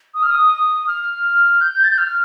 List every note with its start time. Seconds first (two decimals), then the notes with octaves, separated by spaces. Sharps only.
0.14 D#6
0.23 F6
0.31 D#6
0.87 F6
1.61 G6
1.84 A6
1.91 G6
1.98 F6